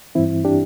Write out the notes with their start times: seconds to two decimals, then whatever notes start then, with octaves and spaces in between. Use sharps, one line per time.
0.15 G2 E3 C4 E4
0.45 D4 G4